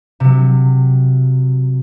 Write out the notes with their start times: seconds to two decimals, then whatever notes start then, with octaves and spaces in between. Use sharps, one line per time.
0.20 C3 F#3